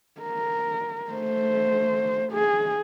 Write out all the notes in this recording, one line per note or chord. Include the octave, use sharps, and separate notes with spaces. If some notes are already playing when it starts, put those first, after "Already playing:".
A#4
A3 C5
G#4